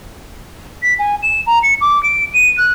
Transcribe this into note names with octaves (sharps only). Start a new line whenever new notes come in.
B6
G#5
E7
A#5
C#7
D6
D7
D#7
F#6